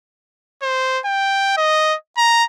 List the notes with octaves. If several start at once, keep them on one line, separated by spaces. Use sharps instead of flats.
C5
G5
D#5
A#5